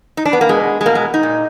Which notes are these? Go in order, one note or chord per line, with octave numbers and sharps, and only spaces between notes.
D#4
D4
B3
A#3
B2 G#3
G#3
B2 A#3
G#3
D#4
A#2